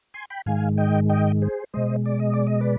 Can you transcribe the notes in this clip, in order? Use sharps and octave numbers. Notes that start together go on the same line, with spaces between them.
G#5 C6
G5 B5
G#2 D#3 G#3 F5 G#5
D#5 G5
D#5 G5
G#4 C5
B2 G#3 C5 D#5
D5
D#5
D5
D#5
B4 D5